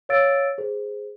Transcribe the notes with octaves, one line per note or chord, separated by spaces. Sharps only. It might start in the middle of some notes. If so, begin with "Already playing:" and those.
C#5 D5 F5 E6 A6 D7
G#4 C5